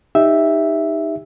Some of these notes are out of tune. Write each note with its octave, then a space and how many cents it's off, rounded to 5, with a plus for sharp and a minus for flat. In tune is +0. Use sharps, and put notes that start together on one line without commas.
D#4 +0 G4 +25 E5 +0